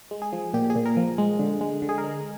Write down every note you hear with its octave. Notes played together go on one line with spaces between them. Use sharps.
G#3
G#4
F3
A#2 G4
G#4
A#2
A#4
F3
G#3
D3
G#3
D3
G#4
A#4
G#3